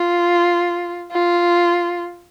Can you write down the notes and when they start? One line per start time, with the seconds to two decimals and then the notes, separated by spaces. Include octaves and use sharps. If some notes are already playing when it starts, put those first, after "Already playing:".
Already playing: F4
1.12 F4